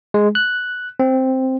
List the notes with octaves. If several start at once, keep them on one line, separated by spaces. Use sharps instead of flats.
G#3
F#6
C4